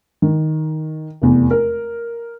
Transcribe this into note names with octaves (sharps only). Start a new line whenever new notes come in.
D#3
F1 E2
A#4